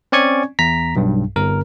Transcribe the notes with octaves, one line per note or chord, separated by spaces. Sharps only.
C4 C#4 D5 G#5 C#6 G#6
E2 A#5 B6
B1 G2
G1 A#4